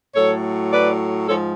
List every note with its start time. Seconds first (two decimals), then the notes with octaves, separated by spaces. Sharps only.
0.15 A2 F#3 A4 C#5
0.72 B4 D5
1.28 G#2 F3 A4 C#5